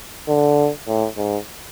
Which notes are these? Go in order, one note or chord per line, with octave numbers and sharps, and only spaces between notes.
D3
A2
G#2